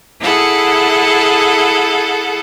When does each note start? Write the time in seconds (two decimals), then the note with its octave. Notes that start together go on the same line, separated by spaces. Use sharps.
0.20 E4 G#4 A4 F#5